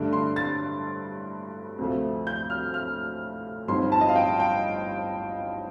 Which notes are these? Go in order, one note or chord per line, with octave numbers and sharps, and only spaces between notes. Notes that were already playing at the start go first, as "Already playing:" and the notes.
Already playing: G2 D3 A3 D4
C6
A6
D2 C3 F3 A3
G6
F6
F6
G1 G2 F3 C4 D#4 C6
A5
D#5
F5
G5
G5